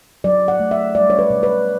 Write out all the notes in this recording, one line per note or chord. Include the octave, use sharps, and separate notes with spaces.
F#3 D5
F#5
A3
E5
G3 D5
C#5
B4
B2
B4